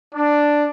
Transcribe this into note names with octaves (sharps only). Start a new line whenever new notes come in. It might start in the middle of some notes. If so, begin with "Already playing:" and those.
D4